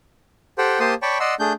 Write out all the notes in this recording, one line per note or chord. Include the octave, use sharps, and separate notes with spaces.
G4 A4 C5 F#5 G5
A#3 G4 C5 A5 C6 D#6
C#5 D5 G5 A5 B5 C#6
D5 D#5 F#5 C6 E6
A3 D4 G#4 G6